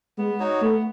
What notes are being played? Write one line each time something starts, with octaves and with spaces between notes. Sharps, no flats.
G#3 B3
D#4 F#4 C#5
A3 B3